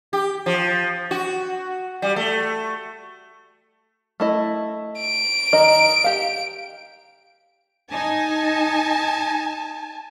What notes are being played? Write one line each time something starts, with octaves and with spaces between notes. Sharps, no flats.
G4
F3
F#4
G3
A3
A3 E4 D#5
D7
D#3 D#5
G4 F5
D#4 G#5 A5